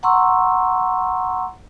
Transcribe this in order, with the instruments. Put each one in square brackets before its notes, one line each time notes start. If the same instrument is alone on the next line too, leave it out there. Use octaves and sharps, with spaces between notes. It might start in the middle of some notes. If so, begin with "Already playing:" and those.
[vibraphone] F#5 A#5 C6 C#6 E6